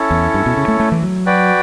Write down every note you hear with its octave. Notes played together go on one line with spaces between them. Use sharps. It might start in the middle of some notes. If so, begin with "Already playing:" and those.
Already playing: C#4 E4 A4 C#5
E2
G2
B2
C#3
A3
A3
E3
F#3
F#4 B4 D5 G5